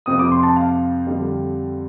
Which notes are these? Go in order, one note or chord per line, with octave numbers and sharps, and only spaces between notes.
F2 C3 F3 D#6
D6
C6
A5
F5
F2 D3 G3